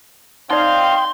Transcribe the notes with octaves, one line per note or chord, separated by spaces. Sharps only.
C4 D#4 D5 D#5 F5 G5 C6